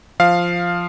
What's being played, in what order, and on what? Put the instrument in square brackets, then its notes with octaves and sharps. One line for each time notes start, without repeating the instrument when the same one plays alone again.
[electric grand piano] F3 F5